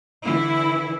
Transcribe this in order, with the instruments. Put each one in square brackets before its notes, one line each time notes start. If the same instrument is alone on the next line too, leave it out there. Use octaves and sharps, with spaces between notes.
[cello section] D3 E3 E4